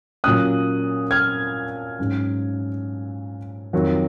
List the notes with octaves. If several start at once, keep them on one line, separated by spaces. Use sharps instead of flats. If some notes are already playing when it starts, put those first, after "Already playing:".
A#2 F#3 A#3 C#4 D#6 F#6
F6 G#6
G#2 F#3 C#4
F2 D#3 F#3